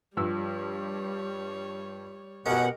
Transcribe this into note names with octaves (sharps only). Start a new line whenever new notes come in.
G2 F3 G3 C#5 E6
F#2 B2 C#4 G4 A#4 D#5 F#5